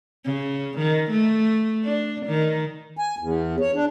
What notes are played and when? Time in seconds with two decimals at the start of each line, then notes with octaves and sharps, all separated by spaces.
0.25 C#3
0.78 D#3
1.10 A3
1.84 D4
2.26 D#3
2.97 G#5
3.19 E2
3.60 C#5
3.74 D4